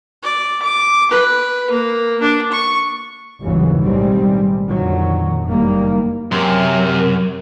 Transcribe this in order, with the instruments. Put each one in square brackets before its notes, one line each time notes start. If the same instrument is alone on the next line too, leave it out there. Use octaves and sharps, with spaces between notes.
[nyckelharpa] D5
D6
B4
A#3
D4
C#6
[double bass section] G1 D#2 G#2 C#3 E3 F#3
B1 A2 D#3 G3 G#3 C4
F2 A#2 D3 D#3 F#3
F#1 D#3 G3 A#3
[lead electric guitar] F#2 [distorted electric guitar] C3 C6 [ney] A#4